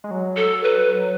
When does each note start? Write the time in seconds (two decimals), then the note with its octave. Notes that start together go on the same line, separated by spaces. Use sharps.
0.04 G#3
0.11 F#3
0.36 A4
0.63 B4